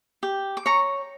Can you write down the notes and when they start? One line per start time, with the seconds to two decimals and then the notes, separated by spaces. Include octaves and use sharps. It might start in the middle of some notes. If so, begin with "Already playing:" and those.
0.23 G4
0.57 D6
0.66 C#5 A#5 C#6